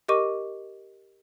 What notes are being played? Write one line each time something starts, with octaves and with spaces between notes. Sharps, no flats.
G4 A#4 D#5 C#6 D6 D#7